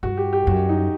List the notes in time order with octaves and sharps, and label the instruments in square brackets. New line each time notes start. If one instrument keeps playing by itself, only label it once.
[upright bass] G2 [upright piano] F#4
[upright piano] G4
G4
[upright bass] F#2 [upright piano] F#4
[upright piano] D#4